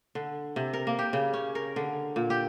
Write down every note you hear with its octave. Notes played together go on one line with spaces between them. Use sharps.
D3
C3
A#4
A#3
G4
C#3
C#4
A#4
D3
A#2
G4